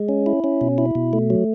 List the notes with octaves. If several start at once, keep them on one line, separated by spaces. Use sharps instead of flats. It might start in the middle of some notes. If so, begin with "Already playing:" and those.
Already playing: G#3
C#4
E4
C#4
B2
E4
B2
A3
F#3